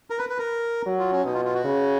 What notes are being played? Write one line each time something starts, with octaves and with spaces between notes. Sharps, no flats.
A#4
B4
B4
A#4
F#3
F4
C#4
B2 D#4
F4
F4
F#4
C#3